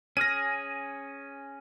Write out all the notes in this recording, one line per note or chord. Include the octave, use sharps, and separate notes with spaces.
C#4 G#4 F6 A#6 D#7